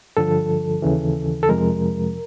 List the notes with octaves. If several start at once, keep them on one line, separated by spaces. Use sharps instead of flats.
G2 D3 F3 A4
D#2 C#3 E3
A4
F2 C3 F3 G#3 A#4